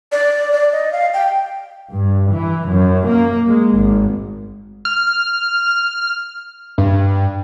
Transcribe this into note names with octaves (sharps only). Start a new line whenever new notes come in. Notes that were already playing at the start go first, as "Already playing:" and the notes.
D5
D5
D#5
F5
G5
G2
E3
F#2
A#3
G#3
G#1
F6
G2